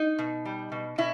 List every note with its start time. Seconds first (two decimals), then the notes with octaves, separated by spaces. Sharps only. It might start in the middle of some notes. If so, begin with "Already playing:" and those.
Already playing: D#4
0.19 B2
0.45 G3
0.72 B2
0.98 B2 E4